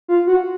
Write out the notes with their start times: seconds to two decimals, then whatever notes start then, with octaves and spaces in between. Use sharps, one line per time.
0.08 F4
0.27 F#4